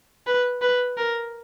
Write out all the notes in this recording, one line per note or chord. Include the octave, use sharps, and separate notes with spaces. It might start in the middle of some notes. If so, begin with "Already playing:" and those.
B4
B4
A#4